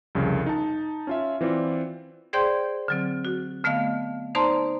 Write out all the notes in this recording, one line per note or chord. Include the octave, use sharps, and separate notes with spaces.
C2 F2 C#3
D#4 A5
C#4 F4 E5
E3 C4 F4 D5
G#4 C5 D5 G5 C6 G6
D3 F#3 C4
F#4
D3 A3 B3 D#5 F5
D#4 C5 D5 A5 A#5 C6